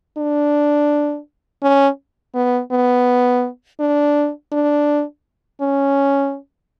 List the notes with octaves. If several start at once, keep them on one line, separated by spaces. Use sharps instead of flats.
D4
C#4
B3
B3
D4
D4
C#4